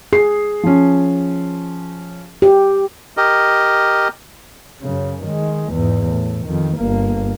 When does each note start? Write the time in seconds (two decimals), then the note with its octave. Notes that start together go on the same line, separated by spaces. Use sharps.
0.13 G#4 C7
0.63 F3 C#4
2.42 G4
3.17 G4 A#4 D#5
4.81 F#2 C#3
5.22 D#3 G#3
5.72 E2 G#2
6.08 A2
6.46 F2 D#3
6.77 G1 A#3